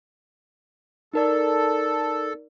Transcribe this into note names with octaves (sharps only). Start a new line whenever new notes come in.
D#4 A4 A#4 D5